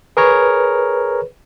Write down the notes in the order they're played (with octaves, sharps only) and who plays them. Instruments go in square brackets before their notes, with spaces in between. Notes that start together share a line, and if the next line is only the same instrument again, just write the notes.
[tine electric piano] G#4 A#4 C#5 [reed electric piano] B4